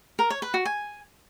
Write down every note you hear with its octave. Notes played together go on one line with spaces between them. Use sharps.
A#4
C#5
B4
F#4
G#5